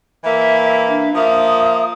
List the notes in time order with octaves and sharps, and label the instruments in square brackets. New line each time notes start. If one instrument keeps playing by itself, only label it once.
[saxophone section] E3 A#3 [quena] E5
[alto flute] D4 [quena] E5
[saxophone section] F3 A#3 [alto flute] E5 [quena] D#6